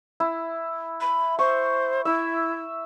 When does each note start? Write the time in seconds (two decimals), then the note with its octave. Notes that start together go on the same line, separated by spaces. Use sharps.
0.20 E4
1.01 B5
1.39 C5 C#6
2.05 E4 E5